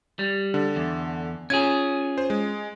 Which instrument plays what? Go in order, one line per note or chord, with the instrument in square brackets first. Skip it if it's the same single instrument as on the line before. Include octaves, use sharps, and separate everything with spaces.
[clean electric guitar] G3
[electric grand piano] D3
[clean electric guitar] E2
[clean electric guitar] C#4 F4 G#4 [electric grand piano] G#6
[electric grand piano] C5
G#3